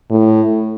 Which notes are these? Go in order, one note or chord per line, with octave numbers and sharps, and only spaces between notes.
A2